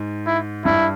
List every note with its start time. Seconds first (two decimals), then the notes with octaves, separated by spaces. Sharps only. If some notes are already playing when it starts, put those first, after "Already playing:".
Already playing: G#2
0.27 E4
0.65 G2 E4